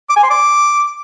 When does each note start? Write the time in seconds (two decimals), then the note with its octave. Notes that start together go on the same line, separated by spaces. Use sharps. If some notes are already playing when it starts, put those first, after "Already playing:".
0.09 D6
0.16 G#5
0.23 C6
0.30 D6